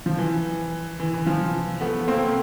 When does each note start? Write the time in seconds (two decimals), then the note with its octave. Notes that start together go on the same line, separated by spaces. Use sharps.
0.06 F3
0.18 E3
1.00 E3
1.14 E3
1.27 F3
1.81 A3 B3
2.08 A#3 C4